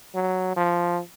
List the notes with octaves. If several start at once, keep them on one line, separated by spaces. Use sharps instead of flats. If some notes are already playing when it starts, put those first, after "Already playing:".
F#3
F3